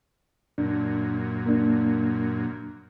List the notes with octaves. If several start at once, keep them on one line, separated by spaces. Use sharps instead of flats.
F#2 A#2 D4
A#3 D4